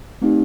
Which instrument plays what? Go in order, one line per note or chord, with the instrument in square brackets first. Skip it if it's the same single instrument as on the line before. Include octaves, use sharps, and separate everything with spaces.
[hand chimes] A3 C4 D#4 G4